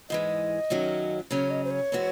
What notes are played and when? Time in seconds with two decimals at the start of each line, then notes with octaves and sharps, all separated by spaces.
0.10 G#2 E3 G#3 D#5
0.70 F#2 D#3 F#3 A3 C#4
1.31 C#3 F#3 C#4 C#5
1.51 D#5
1.64 C5
1.71 C#5
1.92 E3 G#3 C4 F#4